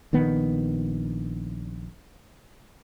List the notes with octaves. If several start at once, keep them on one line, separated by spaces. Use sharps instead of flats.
A#1 D#3 B3